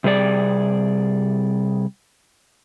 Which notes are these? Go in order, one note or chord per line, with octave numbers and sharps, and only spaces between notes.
C3 G3 G#4 D5